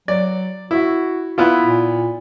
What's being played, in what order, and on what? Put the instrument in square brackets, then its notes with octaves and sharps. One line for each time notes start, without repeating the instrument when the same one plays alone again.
[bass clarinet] F#3 [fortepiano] D5
[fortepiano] E4 [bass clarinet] F#4
[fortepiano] B3 E4 F4
[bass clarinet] A#2